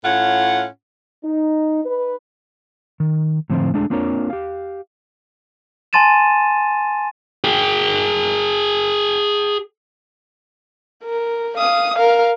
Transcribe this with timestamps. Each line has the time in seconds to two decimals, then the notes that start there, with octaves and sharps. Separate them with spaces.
0.04 A2 C#4 F4 F#5
1.23 D#4
1.85 D#4 B4
3.00 D#3
3.50 A2 D3 F3 C4 C5
3.74 G#3 A3 D4 G#4
3.90 A#3 C4 D4 F4 A#4 C#5
4.30 G4 F5
5.93 G#5 A5 C6 A6 D#7 E7
7.44 G#4 G5
11.05 A#4
11.58 F5 D#6
11.97 A#4 F5